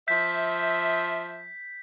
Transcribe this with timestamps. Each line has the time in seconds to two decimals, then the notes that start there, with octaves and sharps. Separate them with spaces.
0.08 F3 E5 G6 B6